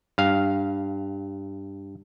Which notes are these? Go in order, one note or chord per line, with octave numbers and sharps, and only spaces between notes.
G2 F5